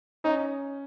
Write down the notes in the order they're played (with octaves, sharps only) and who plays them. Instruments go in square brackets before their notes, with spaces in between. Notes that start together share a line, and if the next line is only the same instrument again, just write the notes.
[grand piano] C#4 [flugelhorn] D#4